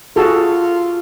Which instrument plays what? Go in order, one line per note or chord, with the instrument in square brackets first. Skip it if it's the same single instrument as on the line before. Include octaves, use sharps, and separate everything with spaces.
[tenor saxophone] F4 [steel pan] F#4 G#4 A4